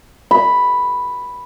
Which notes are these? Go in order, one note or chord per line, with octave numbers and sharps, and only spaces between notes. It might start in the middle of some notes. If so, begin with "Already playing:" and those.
B5